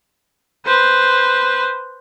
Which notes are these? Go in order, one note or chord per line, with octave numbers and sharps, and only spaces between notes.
B4 C5